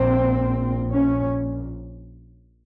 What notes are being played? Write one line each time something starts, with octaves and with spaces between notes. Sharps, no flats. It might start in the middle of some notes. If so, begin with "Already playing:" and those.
Already playing: A#1 A#2 C4
C#4